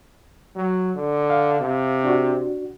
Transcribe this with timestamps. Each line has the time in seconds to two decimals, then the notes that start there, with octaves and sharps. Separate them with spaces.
0.56 F#3
0.95 D3
1.30 F5
1.60 C3
2.04 D4 F#4